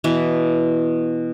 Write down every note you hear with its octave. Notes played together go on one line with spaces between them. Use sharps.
B2 E3 B3 E4